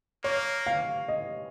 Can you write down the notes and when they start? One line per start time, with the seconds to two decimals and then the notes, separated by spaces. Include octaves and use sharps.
0.24 A#3 C#5
0.66 F5
1.08 D#5